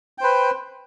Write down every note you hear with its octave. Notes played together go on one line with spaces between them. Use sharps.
B4 C5 G5